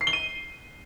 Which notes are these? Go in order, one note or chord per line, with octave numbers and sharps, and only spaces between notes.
C7
G7
D#7